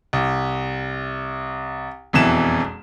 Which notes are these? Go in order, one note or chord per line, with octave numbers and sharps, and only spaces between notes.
C2
E1 F2 B2 E3 E7